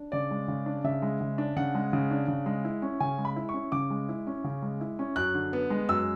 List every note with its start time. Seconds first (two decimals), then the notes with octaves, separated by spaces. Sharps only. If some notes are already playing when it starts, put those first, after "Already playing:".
Already playing: D4
0.12 C#3 D5
0.31 G#3
0.48 C#3
0.66 D4
0.84 C#3 E5
1.02 G#3
1.21 C#3
1.38 D4
1.56 C#3 F#5
1.75 G#3
1.93 C#3
2.11 D4
2.28 C#3
2.46 G#3
2.65 E4
2.82 C#4
3.00 C#3 G#5
3.18 G#3
3.25 B5
3.36 E4
3.49 C#6
3.54 C#4
3.72 C#3 D6
3.90 G#3
4.09 E4
4.27 C#4
4.44 C#3
4.62 G#3
4.81 E4
4.99 C#4
5.16 F#2 F#6
5.34 D3
5.53 B3
5.70 G#3
5.89 F#2 E6